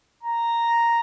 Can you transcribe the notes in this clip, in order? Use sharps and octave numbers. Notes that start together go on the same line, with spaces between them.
A#5